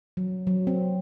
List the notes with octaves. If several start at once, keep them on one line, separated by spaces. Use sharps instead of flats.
F#3
F#3
C4